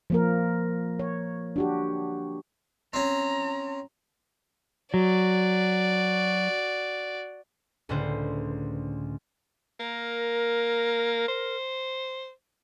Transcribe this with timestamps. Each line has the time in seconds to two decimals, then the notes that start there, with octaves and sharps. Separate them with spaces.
0.10 F3 A#3 A#4
0.99 C#5
1.56 D4 F#4 G4
2.93 C4 C#4 A#5
4.94 F#3 F#4 D5
7.89 C#2 A2 D3 B4 C5
9.80 A#3 A#4
11.28 C5